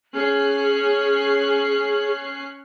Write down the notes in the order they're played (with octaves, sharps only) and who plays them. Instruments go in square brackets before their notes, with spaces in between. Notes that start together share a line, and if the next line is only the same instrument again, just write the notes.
[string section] C#4 F#6 C7 [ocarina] G#4